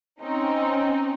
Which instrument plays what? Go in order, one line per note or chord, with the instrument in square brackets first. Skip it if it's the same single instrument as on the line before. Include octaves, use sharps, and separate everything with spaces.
[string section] C4 C#4 D#4